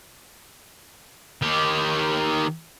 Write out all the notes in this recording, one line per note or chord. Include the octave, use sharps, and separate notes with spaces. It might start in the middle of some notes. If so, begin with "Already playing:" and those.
D#3 G4